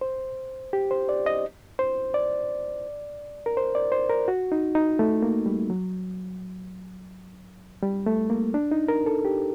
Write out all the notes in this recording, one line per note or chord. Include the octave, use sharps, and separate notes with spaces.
C5
G4
C5
D5
D#5
C5
D5
A#4
C5
D5
C5
A#4
F#4
D#4
D#4
A3
A#3
G3
F#3
G3
A3
A#3
D4
D#4
A#4
A4
G4